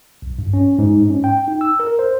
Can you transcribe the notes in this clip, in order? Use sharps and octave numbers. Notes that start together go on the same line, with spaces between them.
B1
G2
C#4
G#2
C#4
G5
D#4
E6
A#4
C5